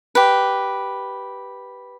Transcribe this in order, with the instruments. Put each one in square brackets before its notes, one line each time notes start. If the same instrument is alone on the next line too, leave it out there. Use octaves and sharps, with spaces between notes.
[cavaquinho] G4 B4